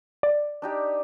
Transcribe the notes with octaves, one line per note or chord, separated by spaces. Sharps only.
D5
D4 D#4 G4